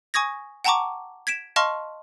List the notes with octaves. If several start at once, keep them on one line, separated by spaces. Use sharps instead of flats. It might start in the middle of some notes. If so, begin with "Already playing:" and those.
G#5 C#6 D#6 G#6 A#6
F#5 G5 A5 A#5 C#6 D6
G#6 B6 D7 E7
D#5 F5 A5 C6 C#6 F6